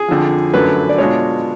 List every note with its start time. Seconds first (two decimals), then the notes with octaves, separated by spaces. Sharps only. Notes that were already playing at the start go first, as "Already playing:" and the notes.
Already playing: G#4
0.08 F2 D3 F3
0.53 F#2 D3 F#3 A3 B4
0.89 D5
0.98 B2 G#3 D4 F4 C#5